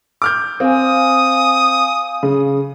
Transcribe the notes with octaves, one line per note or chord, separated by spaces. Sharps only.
D6 F6 G6
C4 F5 G#5 D#6
C#3